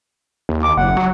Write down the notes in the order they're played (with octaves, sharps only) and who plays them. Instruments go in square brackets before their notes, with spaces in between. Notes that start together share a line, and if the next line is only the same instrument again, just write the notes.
[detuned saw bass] D#2
[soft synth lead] D6
[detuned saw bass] F#1 [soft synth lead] F#5
[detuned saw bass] F#3